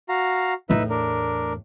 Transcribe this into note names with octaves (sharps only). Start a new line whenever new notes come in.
F#4 F5 A#5
E2 A2 D#4 B4 E5
D4 A#4